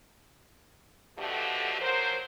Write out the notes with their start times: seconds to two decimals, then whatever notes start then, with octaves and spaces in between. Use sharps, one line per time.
1.18 B2 D3 F3 A3 F#4 G4
1.80 F3 F#3 A#4 C5